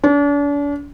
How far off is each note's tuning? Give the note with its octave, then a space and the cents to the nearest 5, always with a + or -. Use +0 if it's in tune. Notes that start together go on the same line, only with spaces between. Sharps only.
D4 -40